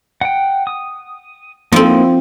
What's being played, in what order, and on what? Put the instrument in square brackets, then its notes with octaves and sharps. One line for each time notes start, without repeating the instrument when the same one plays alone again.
[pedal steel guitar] F#5 G5
D#6
[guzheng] F3 C4 [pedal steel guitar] A#3 D#4 E4